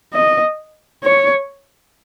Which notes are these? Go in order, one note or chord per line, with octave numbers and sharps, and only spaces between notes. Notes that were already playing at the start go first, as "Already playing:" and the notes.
D#5
C#5